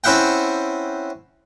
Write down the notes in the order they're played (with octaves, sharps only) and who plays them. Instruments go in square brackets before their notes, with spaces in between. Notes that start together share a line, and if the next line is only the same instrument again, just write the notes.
[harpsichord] C4 C#4 E4 E5 F#5 G5